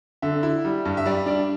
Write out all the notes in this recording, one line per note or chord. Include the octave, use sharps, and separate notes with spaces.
D3 E5
E4
G3
G2
E5
G3 D5
D4 D5